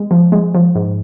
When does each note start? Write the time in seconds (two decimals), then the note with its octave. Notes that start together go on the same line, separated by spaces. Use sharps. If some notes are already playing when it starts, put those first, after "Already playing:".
Already playing: G#3
0.11 F3
0.32 G#3
0.55 F3
0.75 G#2